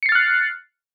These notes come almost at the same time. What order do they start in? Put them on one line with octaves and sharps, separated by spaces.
C#7 C7 A6 F6 F#6